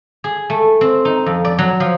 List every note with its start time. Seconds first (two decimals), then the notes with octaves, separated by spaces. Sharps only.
0.24 G#4
0.50 A3
0.81 C4
1.05 D#4
1.26 F2
1.45 D5
1.59 F#3
1.80 F3